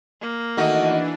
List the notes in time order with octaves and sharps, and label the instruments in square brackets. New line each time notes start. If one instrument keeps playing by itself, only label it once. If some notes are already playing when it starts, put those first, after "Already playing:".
[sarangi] A#3
[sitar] D#3 A3 D#5 [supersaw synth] E3 D4 [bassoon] F#4